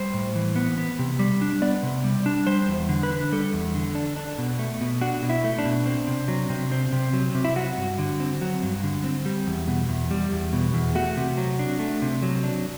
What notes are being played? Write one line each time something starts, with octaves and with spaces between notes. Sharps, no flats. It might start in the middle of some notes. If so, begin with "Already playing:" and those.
Already playing: G3 C5
A2
E3
B3
B3
C3
G3
D4
B3 D5
C3
G3
D4
G3 C5
E2
D3
B4
D4
G3 A4
E2
D3
D4
D4
B2
A3
B2
D4 F#4
B2
E4
A3
D4
B2
C4
C3
F#3
C3
C4
C3
F#3
C3
E4
F#3 F#4
G2
D3
C4
F#3
G2
D3
C4
G3
E2
B2
E2
G3
E2
B2
E2
A3 F#4
C3
F#3
D4
A3
C3
F#3
D4